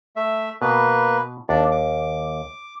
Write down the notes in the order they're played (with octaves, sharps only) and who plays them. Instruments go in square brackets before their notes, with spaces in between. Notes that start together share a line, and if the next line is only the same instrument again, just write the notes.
[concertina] A3 E5
[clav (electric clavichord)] B2 [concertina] A#3 B4
[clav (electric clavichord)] D#2 [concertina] D4 D5
[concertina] D6